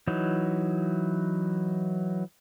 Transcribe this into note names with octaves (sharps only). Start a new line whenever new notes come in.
E3 F#3 D#4